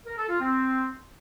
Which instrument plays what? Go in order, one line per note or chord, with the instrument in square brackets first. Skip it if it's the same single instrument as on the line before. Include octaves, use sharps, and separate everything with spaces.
[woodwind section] A#4
A4
F4
C4